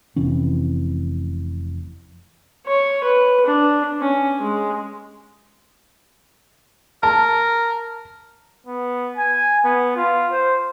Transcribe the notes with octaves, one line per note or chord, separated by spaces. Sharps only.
F1 C3 E3 C#4
C#5
B4
D4
C#4
G#3
A#4 A5
B3
G#5
B3
F4
C5